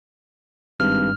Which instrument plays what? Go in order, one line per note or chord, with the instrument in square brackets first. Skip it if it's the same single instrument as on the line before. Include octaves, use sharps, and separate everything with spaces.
[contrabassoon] G#1 [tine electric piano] G2 [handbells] F6